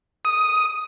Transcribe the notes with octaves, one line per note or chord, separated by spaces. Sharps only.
D#6